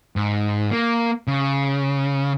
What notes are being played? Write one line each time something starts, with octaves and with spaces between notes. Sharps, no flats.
G#2
A#3
C#3